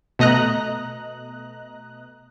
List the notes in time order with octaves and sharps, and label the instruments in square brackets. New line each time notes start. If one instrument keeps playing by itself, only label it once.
[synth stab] B2 A3 D#5 A#5 F#6